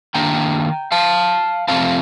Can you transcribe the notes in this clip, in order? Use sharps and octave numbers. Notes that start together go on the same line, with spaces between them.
D#3 A#3 D4 G5 A#5
F5 A5
F2 C3 F3 A3 C4 F5 A5